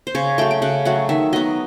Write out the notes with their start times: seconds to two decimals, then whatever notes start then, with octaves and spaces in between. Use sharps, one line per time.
0.07 C5
0.15 C#3 C#5
0.38 F#3 A3 G5
0.51 G5
0.62 C#3 F#5
0.85 F#3 A3 F#5
1.09 D#3 E5
1.33 F#3 B3 D#5